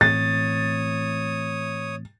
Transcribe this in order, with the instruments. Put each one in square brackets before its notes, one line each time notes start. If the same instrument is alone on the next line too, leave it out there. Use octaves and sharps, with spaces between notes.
[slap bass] A2 E3 C4 [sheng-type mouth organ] C#5 D#6 [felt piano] A6